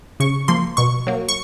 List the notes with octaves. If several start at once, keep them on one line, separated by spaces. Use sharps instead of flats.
C#3 C#6
F3 A#3 C6
B2 C#6
F#3 A#3
C#6